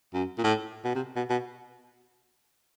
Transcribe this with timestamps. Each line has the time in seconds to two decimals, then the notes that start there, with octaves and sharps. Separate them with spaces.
0.14 F#2
0.38 A#2
0.44 A2
0.85 B2
0.95 C3
1.16 B2
1.30 B2